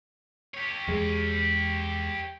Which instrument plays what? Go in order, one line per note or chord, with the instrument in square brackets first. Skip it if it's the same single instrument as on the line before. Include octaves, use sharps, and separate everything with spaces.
[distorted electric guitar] G4 C#5
[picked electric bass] E2 G#3